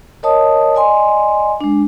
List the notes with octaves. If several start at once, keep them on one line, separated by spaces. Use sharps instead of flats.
A#4 C#5 D#5 A5 D#6
D5 D#5 G#5 C6
G#3 D4